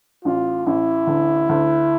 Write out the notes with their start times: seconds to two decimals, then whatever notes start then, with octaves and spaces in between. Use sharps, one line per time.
0.25 A1 F4
0.66 A1 E4
1.07 D2
1.49 D2